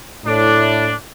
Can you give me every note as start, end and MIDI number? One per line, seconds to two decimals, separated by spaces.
0.25 0.91 45
0.25 0.93 62